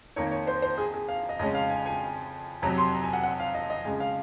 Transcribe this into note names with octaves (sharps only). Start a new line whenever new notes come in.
F2 D#3 A#3 C#5
C#5
C5
C5
G#4
G#4
F5
D#5
F2 C#3 G#3 C#4 D#5
F5
G#5
G#5
F2 C3 F#3 A#5
C6
A#5
G#5
F#5
F#5
F5
D#5
D#5
F2 C#3 G#3 G#5
F5